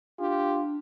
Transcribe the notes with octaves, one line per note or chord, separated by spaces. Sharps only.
D4 F4 G4